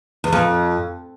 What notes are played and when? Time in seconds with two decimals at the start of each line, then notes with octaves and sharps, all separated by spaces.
0.24 E2
0.33 F2